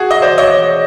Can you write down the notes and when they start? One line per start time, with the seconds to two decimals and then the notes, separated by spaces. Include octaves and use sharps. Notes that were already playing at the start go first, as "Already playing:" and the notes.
Already playing: F#4 G#4
0.11 D#5
0.22 C5 D5
0.38 C#5 D#5